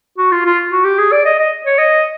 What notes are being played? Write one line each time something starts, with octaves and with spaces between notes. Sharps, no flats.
F#4
F4
F4
F#4
G4
G#4
D5
D#5
D#5
C#5
D#5